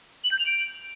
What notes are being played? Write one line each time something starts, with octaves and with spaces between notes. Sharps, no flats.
F#7
G6
F7
D7